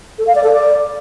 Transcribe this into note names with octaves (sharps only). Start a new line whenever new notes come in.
A4
F5
D5
A4
D5